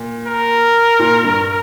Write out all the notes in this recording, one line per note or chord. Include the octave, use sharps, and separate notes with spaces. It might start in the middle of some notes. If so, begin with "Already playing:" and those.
Already playing: A#2
A#4
A#2
G2